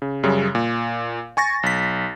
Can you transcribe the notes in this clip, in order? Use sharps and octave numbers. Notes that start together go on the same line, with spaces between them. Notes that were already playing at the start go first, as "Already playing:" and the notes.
C#3
F#2 C#3 G3
A#2
G#5 C#6 A6 A#6
B1 B6